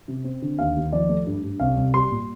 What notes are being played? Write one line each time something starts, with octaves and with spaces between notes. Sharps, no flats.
C3
C4
D3
D#2 F5
D#2
F3 D5
A3
G2
G2
C2 F5
C2
G3 C6
A#2